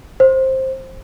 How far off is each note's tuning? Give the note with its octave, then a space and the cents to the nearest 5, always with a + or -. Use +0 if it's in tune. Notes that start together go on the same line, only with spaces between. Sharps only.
C5 +10